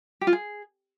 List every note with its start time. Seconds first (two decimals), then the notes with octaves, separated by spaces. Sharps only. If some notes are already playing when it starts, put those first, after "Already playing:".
0.21 G4
0.27 F4
0.33 G#4